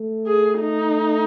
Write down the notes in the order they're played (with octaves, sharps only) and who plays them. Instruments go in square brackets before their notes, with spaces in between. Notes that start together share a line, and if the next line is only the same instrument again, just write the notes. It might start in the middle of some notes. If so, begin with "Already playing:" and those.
Already playing: [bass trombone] A3
[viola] G#4
D#4